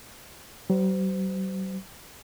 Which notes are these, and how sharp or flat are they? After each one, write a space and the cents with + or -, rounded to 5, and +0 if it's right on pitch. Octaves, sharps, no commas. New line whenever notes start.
F#3 +45 C5 -35